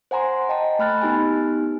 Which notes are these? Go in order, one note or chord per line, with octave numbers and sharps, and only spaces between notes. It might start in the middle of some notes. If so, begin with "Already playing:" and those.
C5 F#5 G#5 A#5 C6
D#5 G5 A5
A3 B5 F6 F#6 A6
B3 D#4 G4 G#5